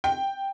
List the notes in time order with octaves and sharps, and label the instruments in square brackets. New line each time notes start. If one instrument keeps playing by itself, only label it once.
[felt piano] G5